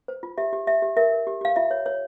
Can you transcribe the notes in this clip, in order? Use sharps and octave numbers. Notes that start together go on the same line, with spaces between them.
C5
F4
G4 E5
G4
G4 E5
G4
A#4 E5
A#4
G4
G4 F5
F4 E5
C#5
C#5